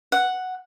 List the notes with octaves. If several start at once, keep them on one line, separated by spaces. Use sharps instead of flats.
F#5